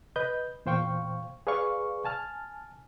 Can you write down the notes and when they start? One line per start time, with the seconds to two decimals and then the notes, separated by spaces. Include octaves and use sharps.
0.16 B4 D#5 G6
0.66 E2 A#2 C5 F5 G5 C#6
1.47 G#4 B4 D5 F5 C#6
2.05 G#5 A5 F6